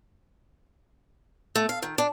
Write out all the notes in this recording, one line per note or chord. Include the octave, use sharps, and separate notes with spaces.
A3
F5
D#3
D4